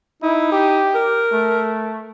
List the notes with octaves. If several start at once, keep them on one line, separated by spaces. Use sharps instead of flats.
D#4 E4
G4
A#4
A3